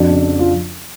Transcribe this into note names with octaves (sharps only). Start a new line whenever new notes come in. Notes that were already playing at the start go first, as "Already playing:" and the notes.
Already playing: F2 D4 F#4
C#3
F4